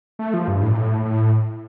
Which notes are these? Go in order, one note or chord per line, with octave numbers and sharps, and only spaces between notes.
A3
F3
G2
A2
A#2
A2
A2